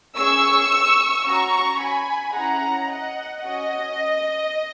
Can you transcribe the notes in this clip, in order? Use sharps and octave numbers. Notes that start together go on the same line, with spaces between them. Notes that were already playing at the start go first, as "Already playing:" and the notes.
C#4 G#4 C#6 E6
C#4 F#4 A#5 C#6
G#5 B5
C#4 E4 G#4 F#5 A#5
D#5 F#5
C#4 F#4 D#5